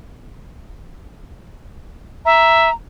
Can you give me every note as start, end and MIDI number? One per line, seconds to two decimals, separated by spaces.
2.25 2.69 76
2.25 2.73 82